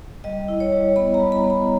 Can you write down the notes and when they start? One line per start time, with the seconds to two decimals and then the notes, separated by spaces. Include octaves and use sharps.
0.24 G3 D#5
0.48 E4
0.60 C#5
0.72 G3
0.96 B3 B5
1.14 A#5
1.20 G3
1.32 B5
1.44 B3
1.50 A#5